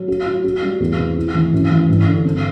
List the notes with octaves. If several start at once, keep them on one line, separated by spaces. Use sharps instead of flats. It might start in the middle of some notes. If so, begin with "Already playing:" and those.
Already playing: F#3
F#4
F#3
F#4
G3
E2
C3
E4
E3
F#2
E3
G2
D3
C4